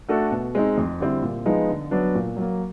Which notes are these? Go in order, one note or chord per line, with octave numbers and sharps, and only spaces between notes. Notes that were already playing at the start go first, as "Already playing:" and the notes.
A3 D4 F#4 A4
B2
G#3 C4 D#4
F2
D3 G3 C4 E4
A#2
F3 G#3 B3 D#4
D3
F#3 B3 D4
A#2
F#3 A#3